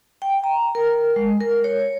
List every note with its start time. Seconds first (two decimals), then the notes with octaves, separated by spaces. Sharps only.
0.22 G5
0.44 A#5
0.75 A#4
1.16 G#3
1.40 A#4
1.64 C#5